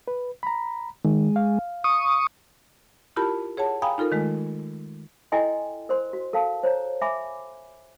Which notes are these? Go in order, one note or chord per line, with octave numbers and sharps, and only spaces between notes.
B4
A#5 B5
D#3 G#3
F5
C#6 D#6
E4 F4 G4 A#4 A5 B5
G#4 C#5 F#5 A5
F5 G5 G#5 A#5 B5 D#6
D#4 F4 A4 A#4
D#3 G#3 A3
E4 A4 D#5 G5 G#5 C6
A#4 C5 C6
F#4
A4 A#4 F5 A5
C5 C#5 A#5
E5 G#5 B5 D6